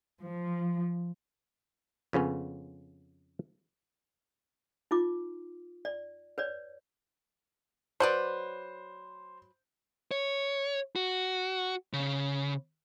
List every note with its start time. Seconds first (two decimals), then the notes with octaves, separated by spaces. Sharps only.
0.22 F3
2.13 F2 C#3 B3 C#4
4.91 D#4 F4 D6
5.85 D5
6.38 B4 C#5 D5
8.00 F#3 B4 C5 D5
10.11 C#5
10.96 F#4
11.93 C#3